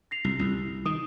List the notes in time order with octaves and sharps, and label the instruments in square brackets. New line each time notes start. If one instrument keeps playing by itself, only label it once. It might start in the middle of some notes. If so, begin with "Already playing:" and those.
[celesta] A#6 C7 F7
[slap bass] C2
C2
[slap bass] D#3 [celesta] D#6